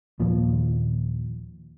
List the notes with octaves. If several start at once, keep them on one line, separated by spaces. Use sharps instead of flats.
D#2 A#2 F3